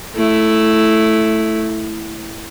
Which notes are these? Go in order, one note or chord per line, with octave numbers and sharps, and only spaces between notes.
A3 E4